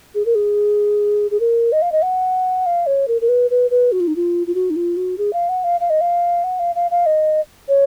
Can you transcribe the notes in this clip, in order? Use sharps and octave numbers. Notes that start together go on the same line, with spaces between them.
G#4
A#4
G#4
G#4
A#4
D#5
F5
D#5
F#5
F5
C#5
A#4
A#4
B4
B4
B4
F#4
F4
D#4
F4
F4
F#4
D#4
F4
F#4
G#4
F5
F#5
F5
F5
D#5
F5
F#5
F5
F5
F5
D#5
C#5